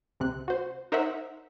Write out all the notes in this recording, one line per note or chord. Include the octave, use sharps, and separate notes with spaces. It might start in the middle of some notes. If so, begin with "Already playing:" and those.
C#2 C3 F#6
F#4 C5
D#4 A#4 C5 C#5 E5 F#5